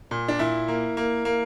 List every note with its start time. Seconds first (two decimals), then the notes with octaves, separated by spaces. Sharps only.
0.11 A#2
0.28 D4
0.39 A#2 E4
0.68 A#3
0.97 A#3
1.25 A#3